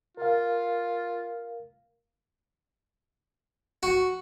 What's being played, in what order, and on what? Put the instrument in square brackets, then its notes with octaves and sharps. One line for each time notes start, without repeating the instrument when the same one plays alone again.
[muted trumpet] F4 [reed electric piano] A#4 F5
[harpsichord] F#4